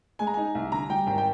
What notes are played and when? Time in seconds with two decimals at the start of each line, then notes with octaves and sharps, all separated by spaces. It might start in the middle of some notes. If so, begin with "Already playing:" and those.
0.19 G#3 G#5
0.27 A#5
0.34 D#4 G#5
0.55 C2
0.72 D3 A#5
0.89 G3 G5
1.07 G#1 G5
1.18 G5